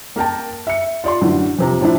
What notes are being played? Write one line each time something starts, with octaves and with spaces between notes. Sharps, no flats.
A#3 A#4 G5 A5
E5 C#7
F4 D5 C6
F#2 A2 D3 E3
F2 C3 A#5
A2 F3 D4 E4